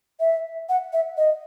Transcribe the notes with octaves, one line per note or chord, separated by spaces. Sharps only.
E5
F#5
E5
D#5